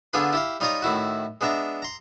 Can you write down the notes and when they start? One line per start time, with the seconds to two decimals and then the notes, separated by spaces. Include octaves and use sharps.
0.13 D3 B3 D4 F4 G#4 B4
0.33 E4 G4 F5
0.60 G3 D#4 F4 C#5 A#5 D#6
0.82 A2 D#3 E4 F#4
1.41 G#3 B3 D4 E5 A#5
1.82 A#5 C6